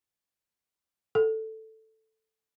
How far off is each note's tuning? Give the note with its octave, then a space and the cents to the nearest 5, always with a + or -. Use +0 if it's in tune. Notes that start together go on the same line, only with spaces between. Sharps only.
A4 +5